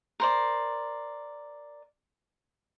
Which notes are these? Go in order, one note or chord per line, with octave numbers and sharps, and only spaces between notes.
A#4 C5 D5